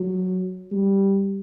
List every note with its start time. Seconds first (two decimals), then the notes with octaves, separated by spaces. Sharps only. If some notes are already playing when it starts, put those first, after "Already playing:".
Already playing: F#3
0.71 G3